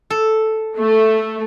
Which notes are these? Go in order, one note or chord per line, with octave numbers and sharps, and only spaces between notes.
A4
A3